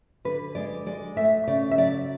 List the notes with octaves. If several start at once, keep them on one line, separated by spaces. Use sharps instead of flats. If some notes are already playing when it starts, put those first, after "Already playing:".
D3 B4
G#3 D5
G#3 D5
A3 E5
C#3 D5
E5
F#3 D5